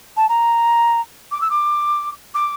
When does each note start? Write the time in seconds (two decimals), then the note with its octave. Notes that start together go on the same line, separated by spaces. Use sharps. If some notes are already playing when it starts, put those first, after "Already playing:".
0.17 A5
0.29 A#5
1.32 D6
1.41 E6
1.50 D6
2.35 D6